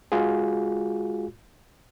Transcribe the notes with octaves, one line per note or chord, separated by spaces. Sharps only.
G#3 F4 F#4 G#4